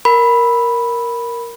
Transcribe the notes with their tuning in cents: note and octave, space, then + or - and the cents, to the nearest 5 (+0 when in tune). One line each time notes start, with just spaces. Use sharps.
A#4 +0 B5 -5